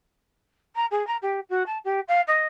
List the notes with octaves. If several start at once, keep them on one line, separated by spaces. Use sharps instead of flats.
A#5
G#4
A#5
G4
F#4
A5
G4
F5
D#5